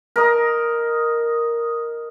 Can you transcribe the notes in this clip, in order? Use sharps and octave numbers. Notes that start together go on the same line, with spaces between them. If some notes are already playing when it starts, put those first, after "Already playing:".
A#4 D#5